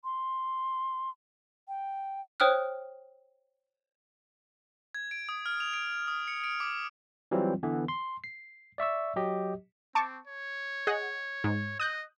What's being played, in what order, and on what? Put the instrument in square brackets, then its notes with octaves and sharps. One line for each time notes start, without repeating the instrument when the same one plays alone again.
[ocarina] C6
G5
[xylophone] C5 C#5 G5 D#6 F6 F#6
[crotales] G#6
D7
D#6
F6
F7
D7
D#6
C#7
D7
D6
[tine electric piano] E3 F#3 G3 C4 F4
D3 E3 B3
C6
C7
D5 E5 C#6 E6
F#3 G4 D#5
[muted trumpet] C4 [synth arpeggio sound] A5 C#6 D6
[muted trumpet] C#5
[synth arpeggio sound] G#4 D#5 F#5
G#2
[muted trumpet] D#5 [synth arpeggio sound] D#6 F#6 G6